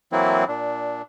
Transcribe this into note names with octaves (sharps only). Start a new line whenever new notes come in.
E3 F#3 A#3 C4 E4
A#2 D4